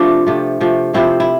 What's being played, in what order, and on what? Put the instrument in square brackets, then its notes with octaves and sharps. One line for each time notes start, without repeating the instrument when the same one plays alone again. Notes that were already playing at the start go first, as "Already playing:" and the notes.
Already playing: [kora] C3 F3 A3 D4 F4
C3 F3 A3
C3 F3 A3
C3 F3 A3 C4 E4
E4